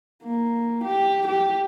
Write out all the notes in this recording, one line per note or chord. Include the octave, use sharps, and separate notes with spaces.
A#3
G4
G4